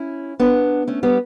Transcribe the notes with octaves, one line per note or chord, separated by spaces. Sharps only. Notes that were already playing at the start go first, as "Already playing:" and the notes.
Already playing: C#4 E4
B3 D4
A3 C#4
G3 B3